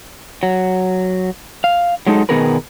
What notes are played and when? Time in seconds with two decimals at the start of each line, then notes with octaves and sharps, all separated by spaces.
0.43 F#3
1.64 F5
2.07 F#3 G#3 D#4 A4
2.29 B2 D#3 B3 G#4 A#4 B4